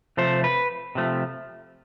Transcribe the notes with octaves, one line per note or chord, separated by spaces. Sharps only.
C3 F3 A3 C5
B4
C3 F3 A3